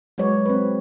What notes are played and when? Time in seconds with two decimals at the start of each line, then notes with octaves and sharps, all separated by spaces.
0.18 F#3 G#3 F#4 B4 C#5 D5
0.46 C4 B4